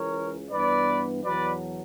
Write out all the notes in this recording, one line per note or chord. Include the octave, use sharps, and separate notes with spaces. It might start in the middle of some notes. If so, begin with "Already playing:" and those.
Already playing: C#2 C#3 E3 A#4 C#5
G2 E3 B3 B4 D5
E2 B2 F#3 B4 D5